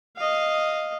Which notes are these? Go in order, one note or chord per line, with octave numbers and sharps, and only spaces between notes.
D#5 F5